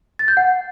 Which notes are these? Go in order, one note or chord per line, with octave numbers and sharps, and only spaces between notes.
A6
G6
F#5